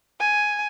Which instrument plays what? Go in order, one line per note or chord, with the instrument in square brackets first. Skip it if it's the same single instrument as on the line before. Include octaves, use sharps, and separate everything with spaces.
[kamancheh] G#5